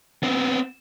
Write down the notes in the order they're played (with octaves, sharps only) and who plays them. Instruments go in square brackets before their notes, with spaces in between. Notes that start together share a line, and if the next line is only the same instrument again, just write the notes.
[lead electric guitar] B3 C4